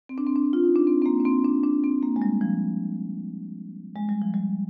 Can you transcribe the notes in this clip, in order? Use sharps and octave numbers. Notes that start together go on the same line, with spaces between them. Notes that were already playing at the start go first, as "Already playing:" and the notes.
C4
D4
C4
D4
F4
D#4
D4
C4
C4
A#3
D4
C4
D4
D4
C4
A#3
G#3
G3
F3
G#3
G3
F3
G3